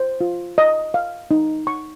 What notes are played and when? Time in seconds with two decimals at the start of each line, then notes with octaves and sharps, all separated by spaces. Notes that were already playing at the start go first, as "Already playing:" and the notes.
Already playing: C5
0.21 F4
0.58 D#5
0.94 F5
1.31 D#4
1.67 C#6